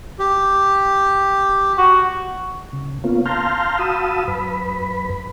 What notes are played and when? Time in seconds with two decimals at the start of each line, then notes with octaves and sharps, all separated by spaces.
0.19 G4
1.78 F#4
2.73 C#3
3.04 A#3 B3 C#4 F4
3.26 F5 A5 A#5 C6 F6 G6
3.79 F#4 F5 A5 B5 D#6 E6
4.28 F#2 B4 B5